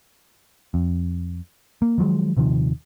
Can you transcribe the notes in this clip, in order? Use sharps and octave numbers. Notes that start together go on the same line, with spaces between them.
F2
A#3
D#3 F3 F#3 G#3
D#1 C3 D#3 F3